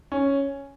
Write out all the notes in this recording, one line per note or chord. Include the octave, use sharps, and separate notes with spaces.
C#4